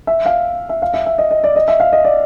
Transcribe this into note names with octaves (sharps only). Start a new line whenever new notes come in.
E5
F5
E5
F5
E5
E5
D#5
D#5
D5
D#5
E5
F5
D#5
D5